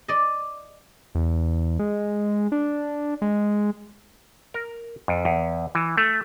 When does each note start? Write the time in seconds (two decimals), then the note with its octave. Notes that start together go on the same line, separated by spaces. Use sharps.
0.08 D5 D#5
1.15 E2
1.79 G#3
2.52 D4
3.22 G#3
4.54 A#4
5.08 F2
5.25 E2
5.75 E3
5.97 A3